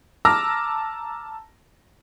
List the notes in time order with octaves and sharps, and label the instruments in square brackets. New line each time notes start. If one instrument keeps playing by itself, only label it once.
[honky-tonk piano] A5 A#5 D6 E6 F6 A#6